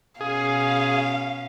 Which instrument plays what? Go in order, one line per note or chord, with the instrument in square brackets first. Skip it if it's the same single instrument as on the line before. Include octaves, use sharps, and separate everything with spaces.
[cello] B2 C#4 [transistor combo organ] G#4 [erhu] F5